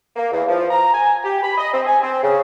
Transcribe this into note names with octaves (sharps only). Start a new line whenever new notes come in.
A#3
E2
F3
A#5
G#5
G4
B5
D#5
C4
G#5
C4
C#3